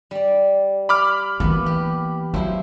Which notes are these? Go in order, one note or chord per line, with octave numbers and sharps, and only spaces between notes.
G3 D5
B5 D6 F6
E3 A#3 B3
G4
F3 F#3 E4 C5